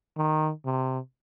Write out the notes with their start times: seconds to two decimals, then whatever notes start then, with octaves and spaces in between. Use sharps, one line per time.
0.17 D#3
0.65 C3